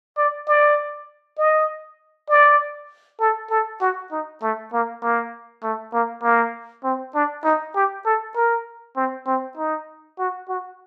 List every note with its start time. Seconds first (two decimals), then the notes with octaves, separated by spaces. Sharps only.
0.17 D5
0.47 D5
1.38 D#5
2.29 D5
3.20 A4
3.50 A4
3.81 F#4
4.11 D#4
4.42 A3
4.73 A#3
5.03 A#3
5.63 A3
5.93 A#3
6.23 A#3
6.84 C4
7.14 D4
7.45 D#4
7.75 G4
8.05 A4
8.36 A#4
8.96 C4
9.26 C4
9.57 D#4
10.19 F#4
10.49 F#4